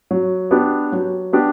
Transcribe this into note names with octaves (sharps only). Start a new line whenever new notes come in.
F#3
B3 D4 G4
F#3
B3 D4 G4